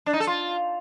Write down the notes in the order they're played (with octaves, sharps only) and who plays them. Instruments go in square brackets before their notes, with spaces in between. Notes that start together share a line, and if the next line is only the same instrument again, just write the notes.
[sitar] D4
D#4
A4
F4